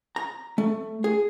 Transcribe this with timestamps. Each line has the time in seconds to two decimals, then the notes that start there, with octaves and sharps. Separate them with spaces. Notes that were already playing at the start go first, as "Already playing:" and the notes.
0.16 A#5
0.58 A3
1.04 G#4